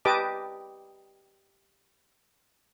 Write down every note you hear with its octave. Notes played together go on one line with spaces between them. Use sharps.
G4 B4 D#5 A5 D6